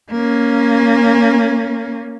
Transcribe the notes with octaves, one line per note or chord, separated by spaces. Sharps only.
A#3 C#4